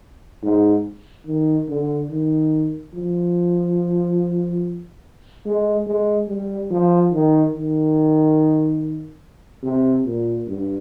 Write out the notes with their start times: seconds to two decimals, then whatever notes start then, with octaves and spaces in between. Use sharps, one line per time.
0.43 G#2
1.26 D#3
1.68 D3
2.10 D#3
2.94 F3
5.46 G#3
5.87 G#3
6.28 G3
6.70 F3
7.13 D#3
7.55 D#3
9.63 C3
10.06 A#2
10.47 G2